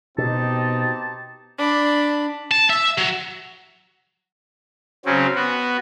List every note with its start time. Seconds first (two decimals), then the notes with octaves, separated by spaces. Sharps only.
0.18 B2 C4 D#4 G4 A5
1.58 D4 B5
2.51 A5
2.69 E5
2.98 F#3
5.06 C#3 F#3 C4 C#4
5.36 B3 F#4